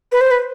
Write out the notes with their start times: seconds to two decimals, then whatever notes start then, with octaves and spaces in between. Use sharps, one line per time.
0.12 B4
0.21 C5
0.31 B4